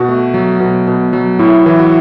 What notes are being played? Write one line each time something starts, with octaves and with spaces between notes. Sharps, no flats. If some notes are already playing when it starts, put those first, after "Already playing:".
Already playing: B2 F#4
A3
F#3
B2
B2
F#3
A2 E4
E3
F#4